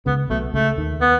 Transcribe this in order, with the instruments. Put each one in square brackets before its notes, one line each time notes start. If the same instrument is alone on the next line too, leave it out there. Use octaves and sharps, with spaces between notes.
[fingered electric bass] C#2 C#3 [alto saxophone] B3
[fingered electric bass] B1 B2 [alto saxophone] A3
[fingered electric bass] C#2 C#3 [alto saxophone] A3
[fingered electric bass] D#2 D#3
[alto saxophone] B3